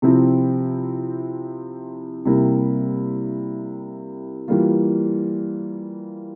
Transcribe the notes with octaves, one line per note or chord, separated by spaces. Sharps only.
C3 F3 C4 E4
C3 G3 A#3 E4
E3 G3 A#3 F4